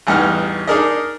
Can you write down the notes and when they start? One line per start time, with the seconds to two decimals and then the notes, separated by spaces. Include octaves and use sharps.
0.07 A1 E2 G2 D#4 F#5 F6
0.67 D4 D#4 G#4 A#4 D5 D#5